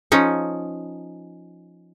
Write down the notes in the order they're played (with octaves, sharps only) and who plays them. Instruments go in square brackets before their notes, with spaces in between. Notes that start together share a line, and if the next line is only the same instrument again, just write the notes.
[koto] F3 C#4 D#4